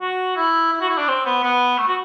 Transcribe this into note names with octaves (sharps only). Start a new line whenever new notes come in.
F#4
E4
E4
F#4
E4
D4
C4
B3
B3
A3
F#4